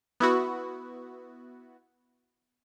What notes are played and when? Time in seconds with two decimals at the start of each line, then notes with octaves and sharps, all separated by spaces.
0.20 B3 E4 F#4